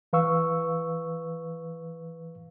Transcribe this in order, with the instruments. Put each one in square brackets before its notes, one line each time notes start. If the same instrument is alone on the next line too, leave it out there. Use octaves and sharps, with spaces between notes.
[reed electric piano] E3 B4 F5 C#6 E6